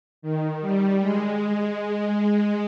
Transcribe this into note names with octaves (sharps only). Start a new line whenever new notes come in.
D#3
G3
G#3